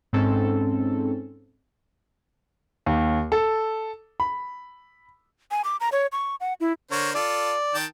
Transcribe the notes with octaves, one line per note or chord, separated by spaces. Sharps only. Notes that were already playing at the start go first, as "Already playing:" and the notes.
G#2 C4 C#4 A4
D#2
A4
B5
G#5
D6
A#5
C#5
C#6
F#5
E4
D3 A#4 C5 C#5
F4 A4 D5
D#3 G5 A5